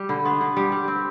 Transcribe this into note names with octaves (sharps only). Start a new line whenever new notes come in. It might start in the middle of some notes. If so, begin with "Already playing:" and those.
Already playing: G3
D3 B5
B3 C6
D3
G3
G3
C4